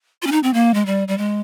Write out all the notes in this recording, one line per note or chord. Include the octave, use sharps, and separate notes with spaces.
F4
C#4
D#4
C4
A#3
G#3
G3
G3
G#3